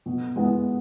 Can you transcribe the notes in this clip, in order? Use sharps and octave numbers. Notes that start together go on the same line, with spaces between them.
B2
G#3 B3 E4